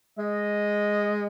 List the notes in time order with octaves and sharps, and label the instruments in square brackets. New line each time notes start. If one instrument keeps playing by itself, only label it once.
[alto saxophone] G#3 [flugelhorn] D#5